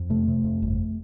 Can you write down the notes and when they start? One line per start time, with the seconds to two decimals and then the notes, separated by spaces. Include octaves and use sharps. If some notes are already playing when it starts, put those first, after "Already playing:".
Already playing: F2
0.10 C3 A3
0.28 C3
0.44 F2
0.62 G1